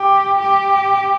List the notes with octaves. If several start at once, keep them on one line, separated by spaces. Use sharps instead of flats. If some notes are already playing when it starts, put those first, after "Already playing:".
Already playing: G4
G4